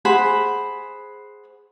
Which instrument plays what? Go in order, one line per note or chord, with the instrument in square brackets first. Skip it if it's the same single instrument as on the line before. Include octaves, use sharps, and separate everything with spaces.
[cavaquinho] G#4 C5 F#5 B5